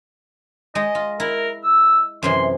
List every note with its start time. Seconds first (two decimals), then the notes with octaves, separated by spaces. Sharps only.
0.75 G#3 D#5
0.95 F4
1.20 E4 A#4
1.64 E6
2.23 F#2 C3 E3 C6